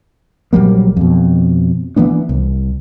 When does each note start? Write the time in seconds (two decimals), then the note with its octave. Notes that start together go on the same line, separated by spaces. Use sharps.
0.53 A#1 F#3 G3 A#3
0.97 F2 B2
1.96 E3 A#3 B3 D4
2.29 C2